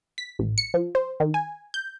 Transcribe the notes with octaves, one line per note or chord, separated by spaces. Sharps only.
B6
A1
C#7
F3
C5
D#3
G#5
G6